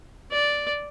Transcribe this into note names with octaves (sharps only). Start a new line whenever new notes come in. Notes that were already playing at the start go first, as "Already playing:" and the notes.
D5